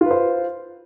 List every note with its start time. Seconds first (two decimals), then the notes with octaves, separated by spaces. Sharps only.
0.01 F4
0.06 B4
0.11 C5